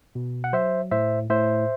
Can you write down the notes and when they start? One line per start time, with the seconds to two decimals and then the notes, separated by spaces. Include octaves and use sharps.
0.15 B2
0.44 F#5
0.53 F#3 C5 E5
0.91 A2 C5 E5
1.30 A2 C5 E5